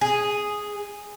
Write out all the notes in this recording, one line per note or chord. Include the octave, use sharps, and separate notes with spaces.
G#4